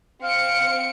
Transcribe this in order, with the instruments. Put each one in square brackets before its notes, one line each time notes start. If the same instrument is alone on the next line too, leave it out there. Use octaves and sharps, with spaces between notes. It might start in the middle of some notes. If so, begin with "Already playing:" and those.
[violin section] C4 C#7 D7 [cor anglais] F5